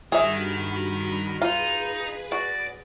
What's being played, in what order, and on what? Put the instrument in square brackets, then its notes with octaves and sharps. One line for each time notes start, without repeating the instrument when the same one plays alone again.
[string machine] G2 F#4 B5 [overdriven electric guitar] D#3 [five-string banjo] G#4 E5
[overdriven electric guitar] D#4 [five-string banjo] F4 [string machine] G#4 B4
[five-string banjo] F#4 [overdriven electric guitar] D5